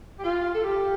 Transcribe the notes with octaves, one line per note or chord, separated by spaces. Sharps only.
G4
F4
A4
G4